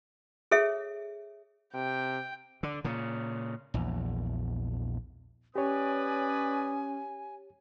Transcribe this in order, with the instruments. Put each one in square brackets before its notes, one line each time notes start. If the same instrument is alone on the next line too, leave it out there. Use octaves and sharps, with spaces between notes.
[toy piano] G#4 A4 C#5 E5
[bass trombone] C3 [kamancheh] G5
[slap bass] D3
A#2 C#3
A#1 E2
[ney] C#4 [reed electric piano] G4 C#5 [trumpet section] B4 D5 D#6 [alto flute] G#5